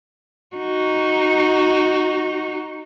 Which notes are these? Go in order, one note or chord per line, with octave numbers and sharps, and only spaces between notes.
D#4 F#4